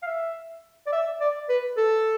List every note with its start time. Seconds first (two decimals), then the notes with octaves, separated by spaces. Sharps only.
0.03 F5
0.07 E5
0.87 D5
0.92 E5
1.21 D5
1.49 B4
1.77 A4